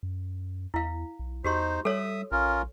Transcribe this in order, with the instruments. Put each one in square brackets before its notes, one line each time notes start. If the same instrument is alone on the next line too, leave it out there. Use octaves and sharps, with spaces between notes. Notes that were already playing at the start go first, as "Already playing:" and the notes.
[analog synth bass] F#2
[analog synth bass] E2 [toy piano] E4 F5
[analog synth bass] B1
[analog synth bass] E2 [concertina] D#4 C5 [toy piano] F#4 G4 C6
[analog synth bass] G3 [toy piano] A4 C#5 [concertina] E5 D#6
[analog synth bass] A#1 [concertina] C#4 F4 A#4